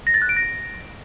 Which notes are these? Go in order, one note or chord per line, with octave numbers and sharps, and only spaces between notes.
A#6
A6
F#6
D7
A#6